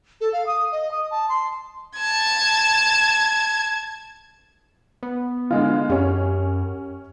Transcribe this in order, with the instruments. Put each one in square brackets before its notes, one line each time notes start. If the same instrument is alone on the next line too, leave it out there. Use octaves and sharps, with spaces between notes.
[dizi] A4
F5
D#6
D#5
D#6
A5
C6
[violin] A5 G#6
[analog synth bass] B3
[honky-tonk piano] D3 G#3 F4
[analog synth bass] F#2 [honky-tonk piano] C#4 G4